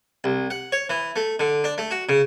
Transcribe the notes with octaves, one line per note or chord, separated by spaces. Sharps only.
C2
F#5
C#5
E3
A3
D3
D4
A3
F#4
C#3